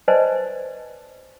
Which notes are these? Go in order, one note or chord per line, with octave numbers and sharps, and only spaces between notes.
B4 C5 D5 D#5 G#5 A5